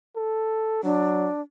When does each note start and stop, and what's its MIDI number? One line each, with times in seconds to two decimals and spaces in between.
0.16 0.78 69
0.83 1.30 54
0.83 1.41 62